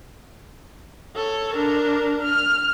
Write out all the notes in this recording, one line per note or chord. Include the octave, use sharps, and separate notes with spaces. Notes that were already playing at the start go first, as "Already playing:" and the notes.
A4 C#5
D4 A#4
F6